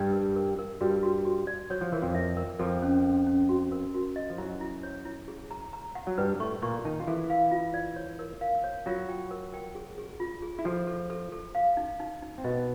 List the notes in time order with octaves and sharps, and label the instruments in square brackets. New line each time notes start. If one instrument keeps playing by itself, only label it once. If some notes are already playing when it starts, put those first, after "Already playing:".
Already playing: [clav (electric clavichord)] G2 G3 [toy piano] D5
[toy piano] A#4
A#4
A#4
[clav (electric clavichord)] G2 G3 [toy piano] F#4
[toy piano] F#4
F#4
D5
[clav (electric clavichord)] F#3 [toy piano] C#5
[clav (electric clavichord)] F3
[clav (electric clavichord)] E3 [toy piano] A#4
[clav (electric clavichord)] F2 F3
[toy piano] E5
A#4
[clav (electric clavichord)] F2 F3 [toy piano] A4
[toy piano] C#4
C#4
C#4
F#4
A#4
F#4
D#5
[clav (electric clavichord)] F3
[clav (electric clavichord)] F#2 F#3 [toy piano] E4
[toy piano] E4
C#5
E4
G#4
A#5
A#5
F#5
[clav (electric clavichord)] F#3
[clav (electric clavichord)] G2 G3 [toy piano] B4
[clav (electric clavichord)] A2 A3 [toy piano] C#6
[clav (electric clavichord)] A#2 A#3 [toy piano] C#6
[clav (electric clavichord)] D#3 D#4 [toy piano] A5
[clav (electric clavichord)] F4
[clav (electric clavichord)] E3 E4 [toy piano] A4
[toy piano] F5
F4
D5
C#5
A#4
F5
C#5
[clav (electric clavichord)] F#3 F#4 [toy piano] F4
[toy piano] G5
A#4
G5
G#4
G#4
F4
G#4
[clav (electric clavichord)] E4
[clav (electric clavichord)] F3 F4 [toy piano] A4
[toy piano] A4
A4
A4
F5
D#4
D#4
D#4
[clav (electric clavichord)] C4
[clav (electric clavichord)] B2 B3 [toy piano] D#5